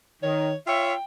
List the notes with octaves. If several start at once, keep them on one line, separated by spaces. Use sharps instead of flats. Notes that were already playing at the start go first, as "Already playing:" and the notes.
D#3 C#5
F4 C#5 E5 G5